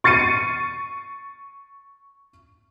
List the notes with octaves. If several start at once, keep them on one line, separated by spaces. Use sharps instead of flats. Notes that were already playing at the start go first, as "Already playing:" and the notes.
C#6 A6 C7 C#7 D#7